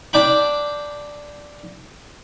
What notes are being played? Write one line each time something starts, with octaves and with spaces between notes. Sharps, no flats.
D4 D5 G5 B5